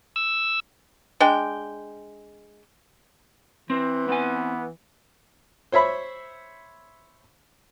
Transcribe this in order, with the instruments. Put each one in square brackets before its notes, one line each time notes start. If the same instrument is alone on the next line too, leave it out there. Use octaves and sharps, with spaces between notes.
[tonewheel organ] E6
[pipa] G#3 D4 G5
[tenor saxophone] E3 [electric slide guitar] C4
[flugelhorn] B3 [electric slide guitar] C4 G#5
[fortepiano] C5 C#5 E5 B5